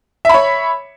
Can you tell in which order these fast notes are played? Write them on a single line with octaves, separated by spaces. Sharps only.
E5 B5 C#5